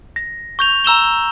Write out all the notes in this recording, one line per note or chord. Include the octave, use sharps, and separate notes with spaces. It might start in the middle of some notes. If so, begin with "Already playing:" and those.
A#6
C#6 G6 F7
A#5 E6 E7 G7